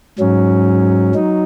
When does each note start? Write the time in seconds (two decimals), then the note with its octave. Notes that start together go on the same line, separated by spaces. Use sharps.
0.19 G#2 F#3 C#4
1.15 F#3 D#4